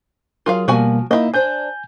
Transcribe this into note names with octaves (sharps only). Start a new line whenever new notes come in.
F#3 F4 G#4 A#4 F5
B2 F3 G3 A#3 F#4 G#5
A#3 D#4 E4 D#5
D4 C5 G#5 G6